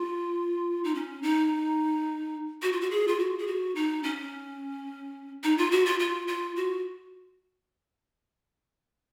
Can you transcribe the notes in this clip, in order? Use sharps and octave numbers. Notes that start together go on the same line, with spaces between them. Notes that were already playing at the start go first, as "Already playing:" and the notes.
Already playing: F4
D#4
C#4
D#4
F#4
F4
F#4
G#4
F4
F#4
G#4
F#4
D#4
C#4
D#4
F4
F#4
F4
F4
F4
F#4